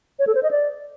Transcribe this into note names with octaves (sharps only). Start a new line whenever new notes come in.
C#5
A4
C5
D#5
D5